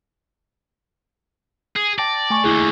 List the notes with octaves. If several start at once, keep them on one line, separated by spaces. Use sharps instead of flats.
G#4
D5 G5 A5 A#6
A3 G#5 C#6
D#2 D3 E4 G#4